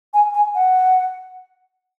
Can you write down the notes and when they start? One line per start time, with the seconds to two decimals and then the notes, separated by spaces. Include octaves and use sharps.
0.14 G#5
0.34 G#5
0.55 F#5